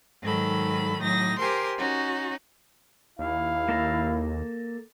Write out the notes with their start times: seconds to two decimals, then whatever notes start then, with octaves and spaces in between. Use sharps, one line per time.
0.21 G#2 D#3 F#3 A4 B5
0.99 A2 F#3 D#4 A#6
1.38 G4 A#4 C5 G#5 C6
1.78 C#4 D#4 F#4
3.19 D#2 E4 F5
3.69 A#3 A4 A#5